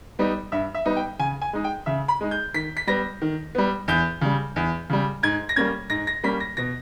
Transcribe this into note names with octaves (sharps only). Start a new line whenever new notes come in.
G3 B3 D#4
G2 E5
E5
G3 B3 D#4
G5
C#3 G#5
G#5
G#3 D#4
G5
C#3 E5
B5
G#3 D#4
G6
D#3 B6
B6
G3 B3 A#6
D#3
G3 B3
E2 G6
C#3 G3
E2
C#3 G3
G#2 G#6
A#6
G3 A#3 C#4 G#6
G#2 A#6
A#6
G3 A#3 C#4 B6
A#6
B2 A#6